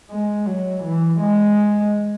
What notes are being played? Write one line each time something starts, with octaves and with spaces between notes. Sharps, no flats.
G#3
F#3
E3
G#3